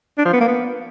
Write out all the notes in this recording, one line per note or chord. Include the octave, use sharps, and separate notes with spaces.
D4
F3
B3
A#3
B3